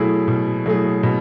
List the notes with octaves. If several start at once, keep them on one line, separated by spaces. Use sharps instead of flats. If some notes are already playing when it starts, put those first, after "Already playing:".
Already playing: B2 F#3 A3 E4 G#4
B2
F#3 A3 E4 G#4
B2